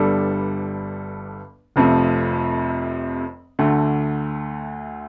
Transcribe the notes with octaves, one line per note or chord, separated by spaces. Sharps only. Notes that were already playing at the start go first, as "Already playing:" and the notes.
Already playing: G1 G2 G3 D4 A4
F1 F2 C3 F3 A3
D2 D3 A3